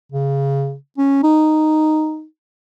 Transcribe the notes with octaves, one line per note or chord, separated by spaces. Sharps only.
C#3
C#4
D#4